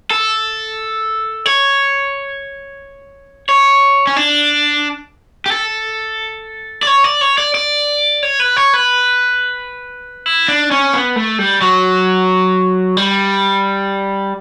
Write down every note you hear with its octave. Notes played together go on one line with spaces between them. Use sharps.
A4
C#5
C#5
C#4
D4
G4
A4
D5
C#5
D5
C#5
D5
D5
C#5
B4
C#5
B4
E4
D4
C#4
B3
A3
G3
F#3
G3